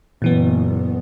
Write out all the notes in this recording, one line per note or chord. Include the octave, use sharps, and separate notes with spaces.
F#1 A#2 E3 B3